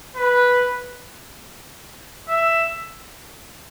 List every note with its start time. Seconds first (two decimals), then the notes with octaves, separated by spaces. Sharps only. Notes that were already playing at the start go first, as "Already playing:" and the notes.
0.17 B4
2.28 E5